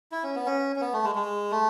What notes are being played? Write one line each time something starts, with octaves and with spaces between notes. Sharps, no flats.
E4
C#4
B3
C#4
C#4
B3
A3
G#3
G#3
A3